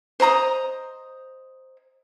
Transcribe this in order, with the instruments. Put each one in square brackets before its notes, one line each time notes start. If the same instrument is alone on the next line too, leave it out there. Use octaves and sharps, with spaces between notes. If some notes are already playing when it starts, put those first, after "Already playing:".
[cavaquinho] C5 D#5 A#5 D#6